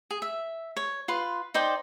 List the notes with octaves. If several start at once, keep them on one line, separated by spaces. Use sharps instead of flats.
G#4
E5
C#5
F4 B4 C6
D#4 C5 D5 G5